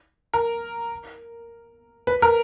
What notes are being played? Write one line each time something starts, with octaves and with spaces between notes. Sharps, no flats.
A#4
B4
A#4